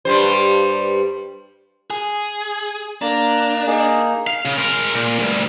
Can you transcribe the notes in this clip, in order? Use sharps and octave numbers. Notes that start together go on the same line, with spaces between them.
G2 G3 C5
G#4
A#3 D4 A#5
A#3 D#4 G#4
F5
C#3
G#3 A#4
A#2
D2 G2